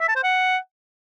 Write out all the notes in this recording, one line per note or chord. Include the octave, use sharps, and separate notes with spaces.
E5
A5
C5
F#5